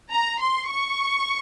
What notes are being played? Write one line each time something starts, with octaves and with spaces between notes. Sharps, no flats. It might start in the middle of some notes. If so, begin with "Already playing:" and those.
A#5
C6
C#6